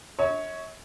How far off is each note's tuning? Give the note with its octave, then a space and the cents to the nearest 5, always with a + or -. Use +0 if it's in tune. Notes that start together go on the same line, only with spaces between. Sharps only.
C#5 +0 E5 -45